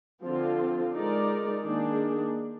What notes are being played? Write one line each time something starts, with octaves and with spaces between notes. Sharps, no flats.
D3 F3 C4 F4
G#3 D#4 A#4 D5
D#3 A#3 D4 G#4